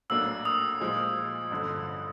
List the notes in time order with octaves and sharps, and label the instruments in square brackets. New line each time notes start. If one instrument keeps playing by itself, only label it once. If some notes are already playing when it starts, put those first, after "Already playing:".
[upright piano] A#1 A2 F#3 A#3 D4 [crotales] E6
[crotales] D#6
[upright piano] A#2 F3 G#3
A1 G2 D3 F3